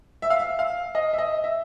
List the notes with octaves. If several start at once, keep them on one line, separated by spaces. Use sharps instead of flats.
E5
F5
E5
F5
D#5
E5
D#5
E5